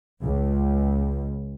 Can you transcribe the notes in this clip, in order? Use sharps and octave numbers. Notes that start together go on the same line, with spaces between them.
C#2